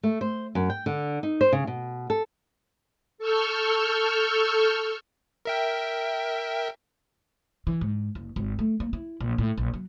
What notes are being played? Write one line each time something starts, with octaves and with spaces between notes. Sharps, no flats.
A3
C5
F#2
G5
D3
D#4
C5
C#3
B2
A4
A4 C#6 E6 F6 G6
A#4 E5 G5
E3
G#2
F#1
G#1
A3
A#3
E4
A#1
A2
A#1
F#3